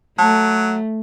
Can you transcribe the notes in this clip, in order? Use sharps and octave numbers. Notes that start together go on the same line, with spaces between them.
F#3 A3 A5